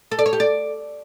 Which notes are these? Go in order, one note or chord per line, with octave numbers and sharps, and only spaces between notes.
A4
D5
C#5
G4
D5